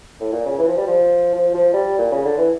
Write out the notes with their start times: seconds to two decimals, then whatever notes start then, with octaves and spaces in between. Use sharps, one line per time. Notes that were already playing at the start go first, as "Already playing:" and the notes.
0.20 A2
0.32 A#2
0.45 C#3
0.58 E3
0.68 F3
0.77 G3
0.87 F3
1.34 F3
1.54 F3
1.73 G3
1.98 A#2
2.11 C#3
2.25 D3
2.38 E3